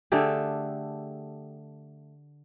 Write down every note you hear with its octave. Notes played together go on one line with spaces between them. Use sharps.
D3 A3 G4 G#4